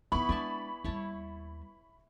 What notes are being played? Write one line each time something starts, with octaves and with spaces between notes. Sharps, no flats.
F3 B3 D#4 E4 B5 C#6
G#3 D4 D5 G#5 A5
D#2 G3 E4 C#5 A5